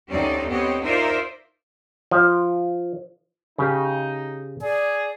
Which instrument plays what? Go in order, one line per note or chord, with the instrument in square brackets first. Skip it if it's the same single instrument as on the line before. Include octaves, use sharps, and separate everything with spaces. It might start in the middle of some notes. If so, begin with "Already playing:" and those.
[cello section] D2 C4 C#4 D#4 G4 D5
B3 C4 G4 C#5 D#5
D#4 F4 A#4 C5 D5 E5
[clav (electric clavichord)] F3
[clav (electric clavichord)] C#3 G4 [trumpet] D#4
[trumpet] G#4 [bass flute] D5